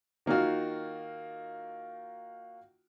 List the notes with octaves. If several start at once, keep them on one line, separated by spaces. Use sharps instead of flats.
D#3 A#3 D#4 F4 F#4